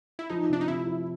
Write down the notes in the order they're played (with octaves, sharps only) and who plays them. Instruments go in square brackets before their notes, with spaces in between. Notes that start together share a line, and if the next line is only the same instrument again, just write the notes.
[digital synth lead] E4
[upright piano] F3 [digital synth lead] D#4
[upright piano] C3 [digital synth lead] D4
[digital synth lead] D#4
[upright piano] C3 [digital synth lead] E4
[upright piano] F3